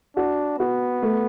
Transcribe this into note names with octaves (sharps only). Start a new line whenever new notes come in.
D4 F#4
B3 F#4
A3